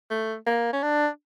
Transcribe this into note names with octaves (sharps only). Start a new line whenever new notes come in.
A3
A#3
C#4
D4